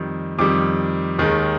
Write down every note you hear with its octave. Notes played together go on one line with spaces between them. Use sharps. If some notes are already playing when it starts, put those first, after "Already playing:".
Already playing: F2 D#3 G3
F2 D#3 G3 D6
D#2 D#3 G#3